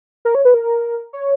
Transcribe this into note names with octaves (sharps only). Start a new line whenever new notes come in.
A#4
C#5
B4
A#4
C#5